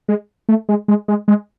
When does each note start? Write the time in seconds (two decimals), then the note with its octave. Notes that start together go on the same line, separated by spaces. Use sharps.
0.08 G#3
0.49 A3
0.69 G#3
0.88 G#3
1.08 G#3
1.28 G#3